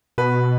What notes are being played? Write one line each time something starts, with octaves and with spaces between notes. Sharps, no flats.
B2 B4